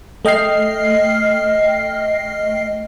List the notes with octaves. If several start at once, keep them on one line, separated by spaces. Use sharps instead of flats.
A3 D#5 G5 F6 C7